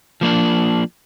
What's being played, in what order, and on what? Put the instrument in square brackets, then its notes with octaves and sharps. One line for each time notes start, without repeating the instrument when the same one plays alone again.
[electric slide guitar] F3 A#3 D4